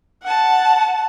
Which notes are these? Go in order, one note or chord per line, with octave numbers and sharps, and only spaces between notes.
F#5 A5